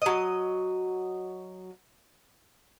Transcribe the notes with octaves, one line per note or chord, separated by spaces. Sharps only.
F#3 D#5